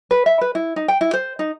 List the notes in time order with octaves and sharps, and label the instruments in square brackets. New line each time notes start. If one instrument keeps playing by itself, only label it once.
[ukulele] B4
E5
B4
E4
D#4
G5
E4
C5
D#4